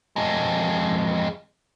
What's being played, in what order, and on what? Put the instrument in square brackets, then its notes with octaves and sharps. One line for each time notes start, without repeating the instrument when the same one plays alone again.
[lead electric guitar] F2 G#3